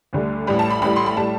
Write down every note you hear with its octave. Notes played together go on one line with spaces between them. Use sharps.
D2 D3 G3
A1 A2 G3 B5
A5
B5
A1 A2 G3 B5
C6
B5
A2 G3 A5